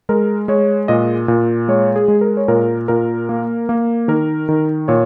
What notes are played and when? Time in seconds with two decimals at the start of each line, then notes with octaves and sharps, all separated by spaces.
0.09 G#3 A#4
0.48 G#3 C#5
0.88 A#2 D#5
1.28 A#2
1.68 G#3 C#5
1.96 G#4
2.08 G#3
2.21 A#4
2.37 C#5
2.48 A#2 A#4
2.88 A#2 A#4
3.29 A#3
3.69 A#3
4.08 D#3 A#4
4.49 D#3
4.88 A#2 C#5